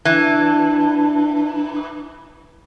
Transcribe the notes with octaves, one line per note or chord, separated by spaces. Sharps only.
E3 D4